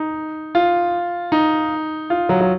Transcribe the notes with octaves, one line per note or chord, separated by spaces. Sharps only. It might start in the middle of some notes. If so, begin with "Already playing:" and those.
Already playing: D#4
F4
D#4
F4
F#3
F#3